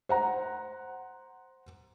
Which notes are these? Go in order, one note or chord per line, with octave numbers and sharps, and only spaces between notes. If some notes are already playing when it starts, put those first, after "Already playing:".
C5 F#5 A#5